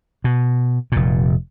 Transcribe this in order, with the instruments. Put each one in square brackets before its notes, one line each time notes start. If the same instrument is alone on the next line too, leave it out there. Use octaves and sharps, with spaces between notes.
[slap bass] B2
F1 A#2